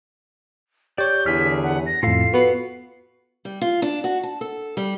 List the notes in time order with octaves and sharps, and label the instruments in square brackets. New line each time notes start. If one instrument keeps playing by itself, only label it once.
[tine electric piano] G4 C#5 [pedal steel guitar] D5 [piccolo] G6
[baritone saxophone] E2 [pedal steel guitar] D3 G#4 F6 [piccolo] B6
[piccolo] F#5
A#6
[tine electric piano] F2 A2 [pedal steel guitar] F4 A4 F5 [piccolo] C7
[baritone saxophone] B3 [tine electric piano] F#4
[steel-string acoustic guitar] G3
F4
D4
F#4
A5
A4
G3